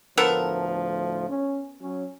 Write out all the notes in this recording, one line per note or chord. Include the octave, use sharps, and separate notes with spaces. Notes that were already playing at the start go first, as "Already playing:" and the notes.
D2 A2 F3 B3 A4 A#4
C#4
F#3 C#4